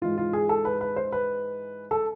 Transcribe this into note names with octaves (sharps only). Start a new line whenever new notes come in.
G#2 E3 F4
F4
G#4
A4
B4
B4
C5
B4
A4